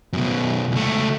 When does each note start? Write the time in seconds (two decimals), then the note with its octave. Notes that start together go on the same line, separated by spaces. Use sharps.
0.13 F#2 B2
0.72 C#2 A3